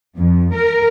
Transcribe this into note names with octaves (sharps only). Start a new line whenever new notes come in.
F2
A#4